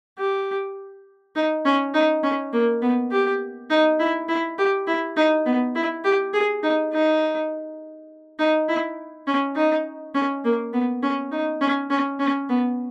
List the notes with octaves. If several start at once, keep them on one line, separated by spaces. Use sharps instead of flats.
G4
D#4
C#4
D#4
C#4
A#3
B3
G4
D#4
E4
E4
G4
E4
D#4
B3
E4
G4
G#4
D#4
D#4
D#4
E4
C#4
D#4
C#4
A#3
B3
C#4
D#4
C#4
C#4
C#4
B3